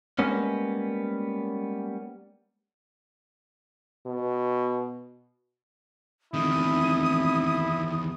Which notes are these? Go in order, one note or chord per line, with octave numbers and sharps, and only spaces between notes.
G3 G#3 A#3 B3 C#4
B2
F1 E2 D#3 E4 D#6